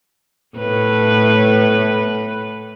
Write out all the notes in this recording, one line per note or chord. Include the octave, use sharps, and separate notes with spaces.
A2 B4